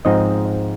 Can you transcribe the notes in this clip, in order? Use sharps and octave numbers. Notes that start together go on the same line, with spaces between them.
G#2 F3 C4 D#4 D#5